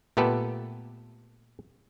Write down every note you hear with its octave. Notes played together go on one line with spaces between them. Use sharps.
A#2 A3 B3 G4 A4 B4